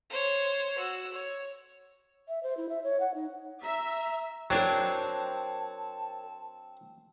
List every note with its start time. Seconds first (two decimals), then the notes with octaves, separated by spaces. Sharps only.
0.10 C5 C#5
0.78 F#4 E6
1.13 C#5
2.28 E5
2.43 C5
2.57 E4
2.69 E5
2.83 C#5
3.00 F#5
3.14 D#4
3.64 E5 A#5
4.50 F#3 C4 D4 A#4 C5 C#5 A5